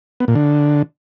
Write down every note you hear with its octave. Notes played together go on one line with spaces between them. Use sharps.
B3
A#2
D3